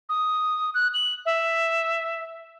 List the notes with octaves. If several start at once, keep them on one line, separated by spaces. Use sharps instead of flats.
D#6
F#6
F#7
E5